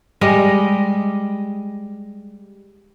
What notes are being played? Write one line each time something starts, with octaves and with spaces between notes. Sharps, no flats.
G3 G#3 D#5